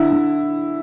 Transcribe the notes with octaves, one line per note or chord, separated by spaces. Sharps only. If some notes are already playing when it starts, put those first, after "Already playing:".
Already playing: D3 E4
D3